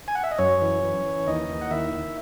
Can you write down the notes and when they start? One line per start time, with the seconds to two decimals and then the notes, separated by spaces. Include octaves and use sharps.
0.08 G#5
0.15 F#5
0.24 E5
0.31 D#5
0.38 F#2 C#4 C#5
0.62 E3
0.83 E3
1.05 E3
1.26 D#2 D#4 D#5
1.49 D#2
1.61 F#5
1.71 D#3 E4 E5
1.93 D#3